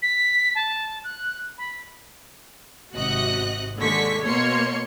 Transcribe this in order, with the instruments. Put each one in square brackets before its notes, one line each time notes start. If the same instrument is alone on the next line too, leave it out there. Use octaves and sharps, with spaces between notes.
[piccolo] B6
A5
F#6
B5
[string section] G#1 C3 F#4 D#5 F#6
D#2 D3 G#3 C#6 B6
B2 A#3 C#5 C6 C#7